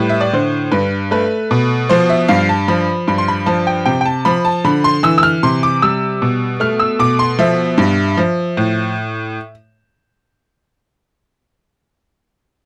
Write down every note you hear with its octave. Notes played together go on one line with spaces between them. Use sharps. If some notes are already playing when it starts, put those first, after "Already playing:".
Already playing: A2 G3 B4
E5
D5
D3 C5
G2 B4
A3 B4
B2
F3 C5
E5
G2 F5
A5
F3 B5
G2 B5
C6
B5
F3 A5
G5
C3 G5
G5
A5
F3 B5
A5
D3 B5
C6
E3 E6
E6
F6
C3 C6
D6
G3 E6
B2
A3 F6
E6
B2 D6
C6
F3 E5
G2
F3
A2